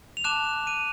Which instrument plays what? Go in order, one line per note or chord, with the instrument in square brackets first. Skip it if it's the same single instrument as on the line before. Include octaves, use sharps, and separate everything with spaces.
[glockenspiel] F7
A5 D6 F#6 E7
D#7